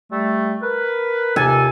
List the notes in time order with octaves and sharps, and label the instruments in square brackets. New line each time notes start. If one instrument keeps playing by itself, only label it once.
[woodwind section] G3 A3
A#4 B4
[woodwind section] D#2 C3 A4 [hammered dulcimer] G#5